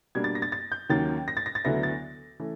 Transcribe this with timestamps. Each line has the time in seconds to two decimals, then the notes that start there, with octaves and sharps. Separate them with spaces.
0.15 B2 G3 A#3 D4 G#6
0.24 A6
0.35 A#6
0.42 A6
0.52 A6
0.72 G6
0.89 D#2 D#3 F#3 A#3 C#4 A6
1.28 A#6
1.37 A6
1.46 A#6
1.55 A6
1.64 D2 D3 F#3 B3 E4 A#6
1.83 A6
2.40 E3 A3 C#4